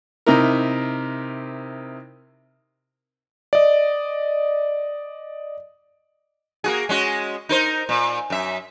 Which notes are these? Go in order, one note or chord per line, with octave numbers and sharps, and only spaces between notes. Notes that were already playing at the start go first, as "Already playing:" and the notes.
C3 D#4 E4 A#4
D5 D#5
A#3 F#4 G#4
G#3 C#4 F#4
D#4 A#4 C5
A#2
F#2 E5